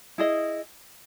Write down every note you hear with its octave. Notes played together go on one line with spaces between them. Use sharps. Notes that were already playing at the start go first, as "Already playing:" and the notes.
E4 G#4 D#5